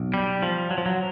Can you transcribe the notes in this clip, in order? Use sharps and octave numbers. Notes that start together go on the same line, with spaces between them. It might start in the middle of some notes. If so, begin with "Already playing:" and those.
Already playing: B1
G3
F3
F#3
F3
F#3